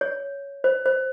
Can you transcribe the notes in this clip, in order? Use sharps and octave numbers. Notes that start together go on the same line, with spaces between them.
C#5
C5
C5